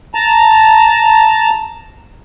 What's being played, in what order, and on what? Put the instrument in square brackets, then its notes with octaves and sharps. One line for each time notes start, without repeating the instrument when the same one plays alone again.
[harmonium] A5 A#5